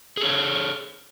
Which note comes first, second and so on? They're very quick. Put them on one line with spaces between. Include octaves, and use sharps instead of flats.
G#4 A4 C#5